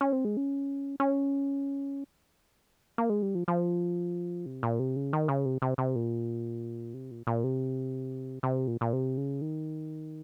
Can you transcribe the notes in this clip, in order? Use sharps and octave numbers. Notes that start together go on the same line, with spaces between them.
C#4
C4
G#3
C#4
C#4
A#3
G#3
G3
F3
F3
C3
A#2
C3
C#3
D#3
C#3
C3
C3
C3
A#2
C3
A#2
A#2
C3
C3
A#2
A#2
C3
C#3
D#3